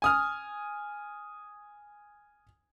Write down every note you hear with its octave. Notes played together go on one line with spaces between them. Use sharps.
G#5 D#6 F6